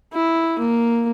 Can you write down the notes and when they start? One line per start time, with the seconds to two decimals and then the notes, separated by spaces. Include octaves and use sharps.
0.13 E4
0.59 A#3